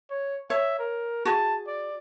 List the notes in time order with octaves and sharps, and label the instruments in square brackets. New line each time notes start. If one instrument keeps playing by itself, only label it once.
[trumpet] C#5
[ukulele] C#5 [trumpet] E5
[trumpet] A#4
[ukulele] F#4 G#4 [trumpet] A5
[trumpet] D5